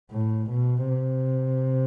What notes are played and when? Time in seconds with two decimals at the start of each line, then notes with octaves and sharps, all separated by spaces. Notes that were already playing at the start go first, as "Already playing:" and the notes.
0.11 A2
0.50 B2
0.89 C3